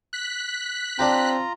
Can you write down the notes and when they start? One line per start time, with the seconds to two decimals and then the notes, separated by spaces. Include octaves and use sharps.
0.13 F#6 B6
0.99 C4 D4 F4 G4 G5 A#5